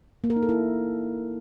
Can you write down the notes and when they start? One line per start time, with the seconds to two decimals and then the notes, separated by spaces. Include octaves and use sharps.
0.24 A#3
0.30 A#4
0.36 D#4
0.43 A4
0.49 E4